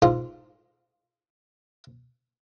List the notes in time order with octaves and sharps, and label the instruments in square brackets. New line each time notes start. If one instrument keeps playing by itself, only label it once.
[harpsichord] G#2 F4